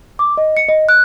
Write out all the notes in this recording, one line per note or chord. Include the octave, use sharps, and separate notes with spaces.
D6
D#5
C#7
D#5
F#6